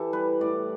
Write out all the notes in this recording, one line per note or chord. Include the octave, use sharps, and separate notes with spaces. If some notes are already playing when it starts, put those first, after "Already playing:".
Already playing: E3 G4 A4
G3 B4
A2 D5